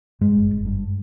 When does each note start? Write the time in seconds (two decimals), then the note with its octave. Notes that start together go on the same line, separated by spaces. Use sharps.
0.21 G2 G#3
0.36 G1
0.51 G1
0.66 G2